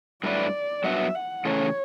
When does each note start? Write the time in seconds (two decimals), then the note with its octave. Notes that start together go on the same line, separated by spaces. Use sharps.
0.23 G2 F#3 A3 E4 B4 D5
0.84 G2 F#3 B3 F#4 E5
1.15 F#5
1.45 C#3 E3 A3 C#5